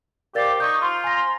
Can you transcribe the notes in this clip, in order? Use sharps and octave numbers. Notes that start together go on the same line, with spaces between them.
G4 A#4 C5 D5 F5 D6 A6
D#4 C#6 G6 G#6
F4 C5 A#5 C6
G#5 A#6